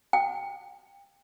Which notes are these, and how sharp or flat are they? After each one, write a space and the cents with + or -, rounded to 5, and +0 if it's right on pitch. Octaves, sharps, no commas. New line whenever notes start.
G5 +25